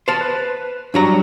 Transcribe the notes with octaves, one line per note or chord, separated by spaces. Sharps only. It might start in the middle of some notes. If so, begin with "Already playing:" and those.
C5 A5
B4
G2 F#3 D4 A#5